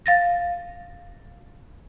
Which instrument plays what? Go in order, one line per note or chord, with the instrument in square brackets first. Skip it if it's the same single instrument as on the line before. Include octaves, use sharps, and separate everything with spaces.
[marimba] F5 A6 A#6